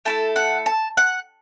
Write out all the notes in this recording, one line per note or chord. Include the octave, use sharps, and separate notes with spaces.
A3 E4 A4 A5
F#5
A5
F#5